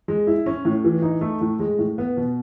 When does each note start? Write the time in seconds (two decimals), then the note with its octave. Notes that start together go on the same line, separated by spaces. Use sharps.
0.08 G#3
0.27 E4
0.46 C#4
0.65 A2
0.84 E3
1.02 D#4
1.21 A3
1.41 A2
1.59 G#3
1.79 A2
1.98 B3
2.17 B2